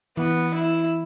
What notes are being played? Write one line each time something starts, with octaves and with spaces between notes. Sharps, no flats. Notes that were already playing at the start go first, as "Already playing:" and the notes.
E3 B3
E4